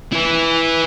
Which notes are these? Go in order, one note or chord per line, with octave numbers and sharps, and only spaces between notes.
E4 B4